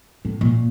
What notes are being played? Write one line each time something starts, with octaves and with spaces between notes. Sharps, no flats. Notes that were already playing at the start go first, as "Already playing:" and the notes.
A2
A#2